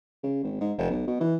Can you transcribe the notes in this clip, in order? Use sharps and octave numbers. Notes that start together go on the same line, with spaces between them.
C#3
G#1
G#2
F1
B1
B2
E3